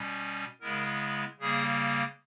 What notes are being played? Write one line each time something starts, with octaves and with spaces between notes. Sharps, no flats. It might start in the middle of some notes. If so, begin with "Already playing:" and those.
Already playing: B2 G3 C#4
C#3 G#3 B3 E4 A#4
C#3 G3 A#3 G#4